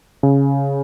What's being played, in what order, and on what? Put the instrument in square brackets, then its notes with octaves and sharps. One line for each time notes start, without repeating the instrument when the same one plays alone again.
[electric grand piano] C#3